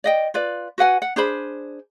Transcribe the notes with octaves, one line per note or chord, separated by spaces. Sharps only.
D5 D#5 G5
F4 B4 D5
F#4 B4 F#5 G#5
F#5
D4 G#4 C5 B5